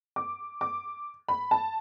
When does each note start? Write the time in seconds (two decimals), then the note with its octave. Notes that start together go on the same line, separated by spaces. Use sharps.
0.16 D6
0.61 D6
1.28 B5
1.51 A5